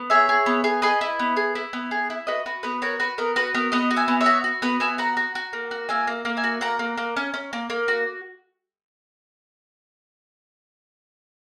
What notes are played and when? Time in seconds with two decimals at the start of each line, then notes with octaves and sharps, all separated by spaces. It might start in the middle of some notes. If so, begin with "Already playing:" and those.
Already playing: B3
0.10 G#4 C#5 E5
0.29 G#4
0.46 B3
0.64 G#4
0.82 G#4 B4 D#5
1.01 E4
1.19 B3
1.36 G#4
1.55 E4
1.73 B3
1.91 G#4
2.10 E4
2.27 F#4 B4 D#5
2.46 F#4 B4
2.63 B3 B4
2.82 F#4 A#4 C#5
3.00 F#4 B4
3.18 B3 A#4
3.36 F#4 B4
3.54 B3 A#4
3.72 B3 D#5 F#5
3.91 F#4
3.96 E5 G#5
4.08 B3
4.21 C#5 E5
4.26 F#4
4.44 F#4
4.62 B3 B4
4.80 B3 E5 G#5
4.98 F#4 F#5 A#5
5.17 F#4
5.35 F#4
5.53 A#3
5.71 F#4
5.89 A#3 E5 G#5
6.07 A#3
6.25 A#3
6.37 E5 G#5
6.44 F#4
6.61 A#3 F#5 A#5
6.79 A#3
6.97 A#3
7.17 C#4
7.34 C#4
7.53 A#3
7.70 A#3
7.88 F#4